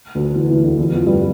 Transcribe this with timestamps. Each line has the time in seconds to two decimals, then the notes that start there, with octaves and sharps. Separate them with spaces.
0.15 D2 D3
0.35 E2 E3
0.50 E2 E3
0.64 D2 D3
0.78 E2 E3
0.92 F2 F3
1.06 G2 G3